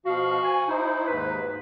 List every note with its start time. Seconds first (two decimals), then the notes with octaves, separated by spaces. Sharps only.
0.06 B2 F3 F#4 F5
0.43 G#5
0.68 D#4 E4 C5
1.07 D#2 G#2 B4